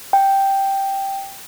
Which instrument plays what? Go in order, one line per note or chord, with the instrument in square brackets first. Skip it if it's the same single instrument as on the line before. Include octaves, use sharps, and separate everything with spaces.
[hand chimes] G5